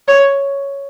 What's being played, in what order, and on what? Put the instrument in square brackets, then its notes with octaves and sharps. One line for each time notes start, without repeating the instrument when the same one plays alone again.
[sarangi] C#5